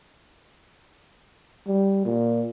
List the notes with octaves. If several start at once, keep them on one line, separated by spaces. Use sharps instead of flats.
G3
A#2